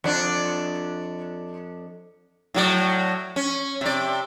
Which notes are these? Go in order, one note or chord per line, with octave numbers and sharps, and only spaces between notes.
F2 D4
A2 F#3 D5
C#4
C3 D5